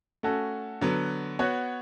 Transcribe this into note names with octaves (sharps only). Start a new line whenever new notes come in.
A3 C#4 F#4 A4
D3 F#3 B3
B3 F#4 C#5